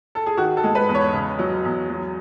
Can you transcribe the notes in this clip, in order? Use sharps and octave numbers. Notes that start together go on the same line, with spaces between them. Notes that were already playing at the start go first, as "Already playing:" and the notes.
A4
G#4
D#3 F#4
A4
G#3
B4
E2
C#5
C#3
F#3
E2
F#3